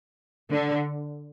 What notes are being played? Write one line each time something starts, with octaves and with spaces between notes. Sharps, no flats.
D3